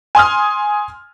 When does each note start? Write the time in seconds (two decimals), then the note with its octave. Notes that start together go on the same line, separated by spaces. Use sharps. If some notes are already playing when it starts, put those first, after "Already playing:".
0.15 G#5 C6 D#6 F6